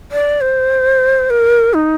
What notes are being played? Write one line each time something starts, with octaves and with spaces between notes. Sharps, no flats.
D5
C5
A#4
D#4